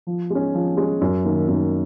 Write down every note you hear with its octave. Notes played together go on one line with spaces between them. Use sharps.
F3
G#3 C#4
F3
G#3 C#4
F#2
D#3 A#3
F#2